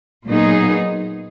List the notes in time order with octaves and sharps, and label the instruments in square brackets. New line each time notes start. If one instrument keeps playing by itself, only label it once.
[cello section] A#2 F#3 B3 D#4 G#4